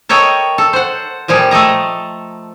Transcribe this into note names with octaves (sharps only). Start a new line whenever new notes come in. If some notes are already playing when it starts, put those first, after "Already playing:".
A4 A#4 C#5 D#5 G5
A4
C5 F#5
A#2 F3 G3 G#4
A3 A4 D#5 A#5